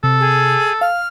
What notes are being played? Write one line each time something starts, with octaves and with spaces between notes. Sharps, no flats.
C3 A4
G#4
F5 F6